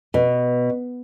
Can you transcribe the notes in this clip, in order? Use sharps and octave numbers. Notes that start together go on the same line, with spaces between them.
B2